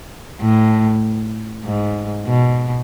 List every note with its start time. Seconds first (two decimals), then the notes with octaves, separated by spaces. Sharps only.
0.41 A2
1.65 G#2
2.27 B2